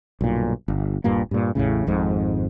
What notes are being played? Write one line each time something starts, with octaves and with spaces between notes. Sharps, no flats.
B1 G2 A#2
G1
D#1 G2 A#2 A#3
G2 A#2
A1 E2 A2 C#3
G#1 F2 G#2